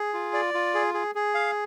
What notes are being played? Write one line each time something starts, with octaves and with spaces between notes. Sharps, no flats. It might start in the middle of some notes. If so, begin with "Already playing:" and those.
Already playing: G#4
F4
D5
F4
G#4
G#4
G#4
F5